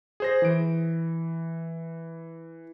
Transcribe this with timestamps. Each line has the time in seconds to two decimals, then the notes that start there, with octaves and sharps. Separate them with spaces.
0.20 G#4 C5 A#6
0.42 E3 D7